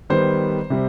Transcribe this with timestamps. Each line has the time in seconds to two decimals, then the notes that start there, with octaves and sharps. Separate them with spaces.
0.10 D#3 G3 B3 C5
0.70 C3 G3 C4